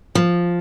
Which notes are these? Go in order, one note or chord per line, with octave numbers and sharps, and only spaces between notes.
F3